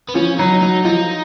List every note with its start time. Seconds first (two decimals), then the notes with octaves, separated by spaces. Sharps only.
0.09 B3
0.15 F3 C#4
0.39 F#3 D#4
0.62 F#3 D#4
0.85 F3 D#4